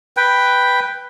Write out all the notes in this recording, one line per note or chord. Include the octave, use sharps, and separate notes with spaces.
B4 G5